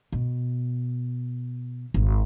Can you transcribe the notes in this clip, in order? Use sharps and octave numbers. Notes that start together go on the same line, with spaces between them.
B2
G#1